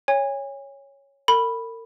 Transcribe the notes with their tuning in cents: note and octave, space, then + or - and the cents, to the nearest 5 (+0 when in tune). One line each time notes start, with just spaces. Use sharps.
C#5 +0 G#5 -35
A#4 -40 B5 -5